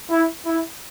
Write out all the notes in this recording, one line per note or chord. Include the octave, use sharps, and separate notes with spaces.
E4
E4